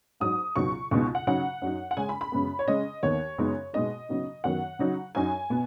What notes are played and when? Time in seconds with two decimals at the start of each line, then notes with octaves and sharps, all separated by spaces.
0.20 G#2 F#3 D#4 D#6
0.56 C#2 B2 F#3 B3 D#4 C#6
0.91 C#2 B2 G#3 B3 D#4 C#6
1.15 F#5
1.27 C#3 F#3 D#4 F#5
1.62 F#2 F#3 D#4
1.91 F#5
1.97 C#3 G#3 C#4 G#5
2.09 B5
2.21 B5
2.32 F#2 C#3 G#3 B3
2.59 C#5
2.67 C#3 G#3 C#4 D#5
3.03 D#2 D#3 B3 C#5
3.38 F#2 C#3 G#3 B3 D#4
3.73 B2 G#3 B3 D#4 D#5
4.09 C#3 F#3 B3 D#4
4.44 F#2 D#3 F#3 B3 F#5
4.79 C#3 F#3 D#4
5.15 F#2 F#3 D#4 G#5
5.50 B2 B3